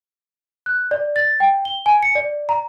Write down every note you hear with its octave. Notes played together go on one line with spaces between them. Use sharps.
F#6
D5
A6
G5
G7
G#5
C#7
D5
A#5